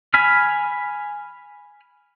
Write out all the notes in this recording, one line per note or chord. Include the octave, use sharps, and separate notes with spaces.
G#5 B5 F6